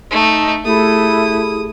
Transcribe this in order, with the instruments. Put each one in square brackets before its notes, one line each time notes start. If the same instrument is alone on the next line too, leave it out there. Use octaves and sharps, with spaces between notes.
[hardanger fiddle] A3 [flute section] D#4
[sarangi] A3 [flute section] E4 [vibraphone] G4 G#4 [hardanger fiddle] D#6